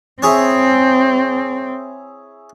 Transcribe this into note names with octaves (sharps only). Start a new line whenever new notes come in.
C4 E4 G#4 C#5